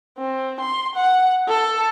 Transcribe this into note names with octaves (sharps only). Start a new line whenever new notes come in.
C4
C6
F#5
A4